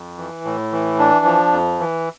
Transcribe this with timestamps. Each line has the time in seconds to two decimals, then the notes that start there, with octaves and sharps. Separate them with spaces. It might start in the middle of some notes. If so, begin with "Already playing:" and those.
Already playing: F2
0.17 E3
0.44 A2
0.72 E3
0.99 D4
1.25 F3
1.52 F2
1.80 E3